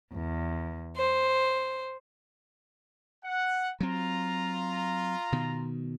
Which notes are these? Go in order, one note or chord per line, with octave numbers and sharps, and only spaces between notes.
E2
C5
F#5
F#3 C4 F4 A#5
B2 D#3